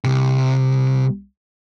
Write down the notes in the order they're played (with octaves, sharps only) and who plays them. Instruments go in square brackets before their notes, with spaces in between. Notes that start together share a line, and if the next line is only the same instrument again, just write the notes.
[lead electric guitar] C2 C3